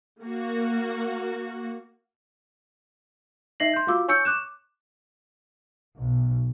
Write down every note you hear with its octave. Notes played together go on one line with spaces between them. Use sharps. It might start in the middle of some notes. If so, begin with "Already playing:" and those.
A#3 F#4
D#4 D#5 E5 A#6 C7 F#7
C6 G6
F4 F#4 F5 D6 E6
C#5 G#5 C#6 E6 G6 C#7
C#6 D6 F#6 E7
B1